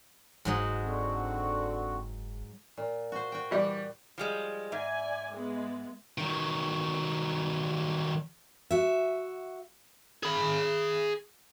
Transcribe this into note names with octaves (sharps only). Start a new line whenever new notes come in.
F#1 G#2 F#3 D#5
D3 C4 F#4
A#2
F#4 C5
F#4 G5
E3 G3 D5
F3 G3 G#3
G#2 D5 E5 G#5
G#3 B3
D#3 F#3
F#4 E5
G#4 B5